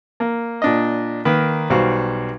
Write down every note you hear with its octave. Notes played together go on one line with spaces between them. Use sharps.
A#3
A#2 D4 D#5
D#3 A#3 B4
B1 G3 F#4 C5 F5